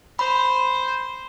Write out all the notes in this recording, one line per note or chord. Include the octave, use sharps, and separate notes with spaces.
C5 B5